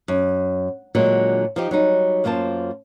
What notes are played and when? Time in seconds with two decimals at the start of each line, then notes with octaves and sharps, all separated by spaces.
0.08 F#2
0.95 A#2 D3 F#3 G#3
1.56 F3 D#4 G4
1.71 F#3 G3 D#4
2.24 F#2 A#3 F4 C5 A5